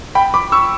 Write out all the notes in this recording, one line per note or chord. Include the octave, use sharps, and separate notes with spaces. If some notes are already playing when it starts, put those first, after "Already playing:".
G5 B5
B5 D6
C#6 E6